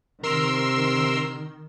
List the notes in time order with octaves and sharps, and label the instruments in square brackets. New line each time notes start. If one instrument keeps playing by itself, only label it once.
[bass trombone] C3 [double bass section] D#3 [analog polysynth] A#4 C6 E6